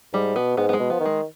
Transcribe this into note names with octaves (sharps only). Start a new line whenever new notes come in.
G#2 G3
B2 B3
G#2 B3
B3
G#3
B2
F3 B3
D#3
G#3